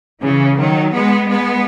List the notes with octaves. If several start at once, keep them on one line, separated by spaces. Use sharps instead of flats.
C#3 E3
D#3 F#3
G#3 B3
G#3 B3